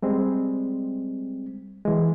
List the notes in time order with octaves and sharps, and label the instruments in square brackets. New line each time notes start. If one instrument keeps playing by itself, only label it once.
[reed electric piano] G3 G#3 C4
E3 G#3